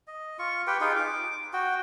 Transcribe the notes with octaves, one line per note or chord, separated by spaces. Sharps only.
D#5
F4 C#6
G4 B4 G5
D#4 F4 G#4
D6
F#4 G5